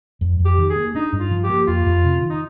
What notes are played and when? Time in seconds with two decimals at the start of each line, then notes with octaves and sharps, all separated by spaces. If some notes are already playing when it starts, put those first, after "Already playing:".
0.21 F2
0.39 F2
0.45 G4
0.58 D#3
0.69 G#4
0.76 A#3
0.95 D4 D#4
1.13 G2
1.19 F4
1.31 F3
1.44 G4
1.49 A#3
1.67 F2 F4
1.86 F2
2.04 C3
2.22 D#3
2.30 D#4